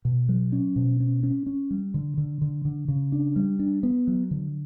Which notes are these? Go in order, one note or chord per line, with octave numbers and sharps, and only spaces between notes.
B2
F#3
C#4
B2
C#4
C#4
C#4
G3
D3
D3
D3
D3
C#3
D4
G3
D4
B3
F#3
D3